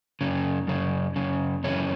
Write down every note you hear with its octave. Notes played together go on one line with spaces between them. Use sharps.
F#2 C#3
F#2 C#3
F#2 C#3
F#2 C#3 E3 C#4